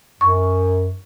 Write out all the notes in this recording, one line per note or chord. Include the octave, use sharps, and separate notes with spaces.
F#2 C#6